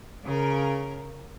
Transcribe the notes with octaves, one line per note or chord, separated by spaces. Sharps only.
C#3 A#4